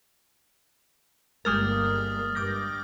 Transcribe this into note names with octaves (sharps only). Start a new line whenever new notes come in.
G1 G3 G#3 A#3 A#4 D#6 F6 A6
G2 D6 G6 A#6